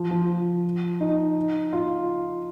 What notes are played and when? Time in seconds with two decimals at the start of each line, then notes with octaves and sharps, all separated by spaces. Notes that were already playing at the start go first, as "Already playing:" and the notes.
Already playing: F3
0.11 F3
1.00 D#4
1.73 F4